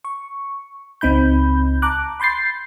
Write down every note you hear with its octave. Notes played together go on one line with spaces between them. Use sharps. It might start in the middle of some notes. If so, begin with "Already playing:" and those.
C#6
C#2 C4 D#4 B5 G6
A5 A#5 D6 F#6
B5 C6 G6 A6 C7